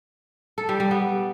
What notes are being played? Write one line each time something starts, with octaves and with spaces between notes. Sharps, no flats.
A4
G3
G3
B3